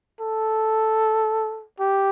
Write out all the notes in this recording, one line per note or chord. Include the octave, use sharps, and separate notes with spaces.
A4
G4